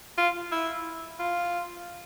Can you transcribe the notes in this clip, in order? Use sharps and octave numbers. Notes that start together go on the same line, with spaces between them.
F4
E4
F4